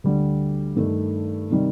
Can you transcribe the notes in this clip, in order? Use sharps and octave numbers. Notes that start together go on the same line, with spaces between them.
D2 D3 G3
G2 D#3 A3
C3 D#3 G3